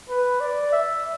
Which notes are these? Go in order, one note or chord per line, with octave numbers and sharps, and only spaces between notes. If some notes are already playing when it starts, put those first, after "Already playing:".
B4
D5
E5